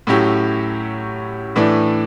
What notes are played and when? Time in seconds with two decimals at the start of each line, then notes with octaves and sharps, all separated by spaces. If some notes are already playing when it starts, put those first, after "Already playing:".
0.07 A2 F#3 C#4 E4 G4
1.56 A2 E3 A3 D4